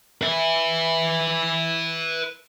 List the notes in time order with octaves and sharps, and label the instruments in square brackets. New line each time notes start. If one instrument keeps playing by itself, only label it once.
[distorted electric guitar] B4 E5